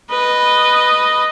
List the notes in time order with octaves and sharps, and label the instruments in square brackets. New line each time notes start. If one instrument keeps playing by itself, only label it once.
[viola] B4 D#5